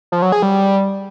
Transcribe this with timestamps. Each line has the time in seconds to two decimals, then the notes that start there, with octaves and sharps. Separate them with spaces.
0.12 F3
0.22 F#3
0.32 G#4
0.42 G3